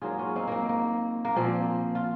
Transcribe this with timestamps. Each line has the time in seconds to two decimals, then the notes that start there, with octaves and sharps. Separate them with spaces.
0.02 G#2 F#3 A#3 F4 G#4
0.19 C#4 F4
0.36 C4 D#4
0.47 A#3 C4
0.69 A#3
1.25 A#3
1.36 A#2 F3 A#3 C4
1.95 F4